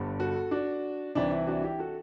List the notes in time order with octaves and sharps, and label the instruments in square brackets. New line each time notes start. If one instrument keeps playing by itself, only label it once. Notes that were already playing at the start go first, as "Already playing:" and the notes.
Already playing: [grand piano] G1 G2 D3
F#4 A4
D4 F#4
C2 C3 E3 D4
E4
D4 F#4
E4 G4
F#4 A4